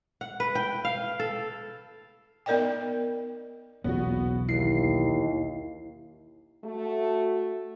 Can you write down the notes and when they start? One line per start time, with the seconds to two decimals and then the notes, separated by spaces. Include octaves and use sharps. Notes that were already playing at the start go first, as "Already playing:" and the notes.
0.21 F#5
0.40 B4
0.55 G5
0.85 F5
1.20 A4
2.46 B3 D#4 A#4 D5 D#5 G5
3.84 B1 E2 C#3 B3 F#4
4.49 D#2 E4 C7
6.65 A3 F#4